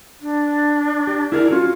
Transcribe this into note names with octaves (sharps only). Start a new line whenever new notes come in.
D4
G4
E4 G#4 A#4 D5
C#4 F4 F#4